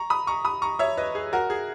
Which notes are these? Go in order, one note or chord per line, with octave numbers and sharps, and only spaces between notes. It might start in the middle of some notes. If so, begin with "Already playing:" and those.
Already playing: A#5 C#6
B5 D#6
A#5 C#6
B5 D#6
A#5 C#6
C#5 E5
B4 D#5
G#4
F#4 A#4
G#4